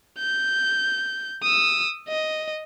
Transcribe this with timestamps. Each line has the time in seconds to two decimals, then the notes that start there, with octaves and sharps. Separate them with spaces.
0.19 G6
1.43 D#6 E6
2.08 D#5